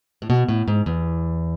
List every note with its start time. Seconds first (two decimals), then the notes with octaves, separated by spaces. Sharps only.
0.22 A2
0.30 B2
0.48 A2
0.68 G#2
0.86 E2